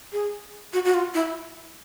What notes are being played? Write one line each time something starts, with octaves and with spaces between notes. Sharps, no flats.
G#4
F#4
F#4
F4
E4